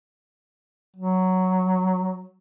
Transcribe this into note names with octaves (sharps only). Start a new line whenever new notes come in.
F#3